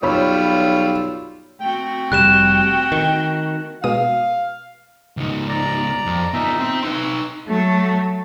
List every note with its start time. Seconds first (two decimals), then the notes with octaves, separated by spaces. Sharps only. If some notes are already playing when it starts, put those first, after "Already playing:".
0.03 B1 G3 F4 C#5 B5 E6
1.60 A3 C4 F#4 G5
2.12 F1 G3 F#6 E7
2.92 D#3
3.84 B2 G#3 F5 D#6
5.17 C#2 D#4
5.49 D5 A#5
6.06 F2
6.34 B3 D#4 F4 E5
6.59 C4 C6
6.84 D#4 B4 E6
7.47 F#3 A3